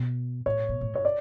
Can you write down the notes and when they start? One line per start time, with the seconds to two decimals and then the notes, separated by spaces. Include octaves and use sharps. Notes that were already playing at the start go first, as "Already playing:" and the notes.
Already playing: B2
0.46 A2 C#5
0.69 B2
0.81 A2
0.93 G2 C#5
1.05 D5